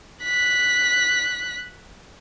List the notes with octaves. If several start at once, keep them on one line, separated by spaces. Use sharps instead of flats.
F#6 B6